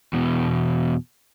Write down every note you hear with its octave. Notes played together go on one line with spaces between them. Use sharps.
E2 B2